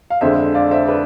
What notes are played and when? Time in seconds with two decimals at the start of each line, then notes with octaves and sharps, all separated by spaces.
0.10 F5
0.21 F2 D3 G#3 C5 E5
0.54 D5 F5
0.71 C5 E5
0.87 B4 D5